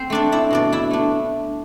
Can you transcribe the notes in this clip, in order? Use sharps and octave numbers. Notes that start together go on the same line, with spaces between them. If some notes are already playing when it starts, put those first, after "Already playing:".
Already playing: C4 C5
A3 D4 D5
E4 E5
B2 D4 D5
E4 E5
A3 D4